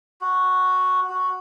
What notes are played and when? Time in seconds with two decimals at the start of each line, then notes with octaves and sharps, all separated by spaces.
0.21 F#4
1.09 F#4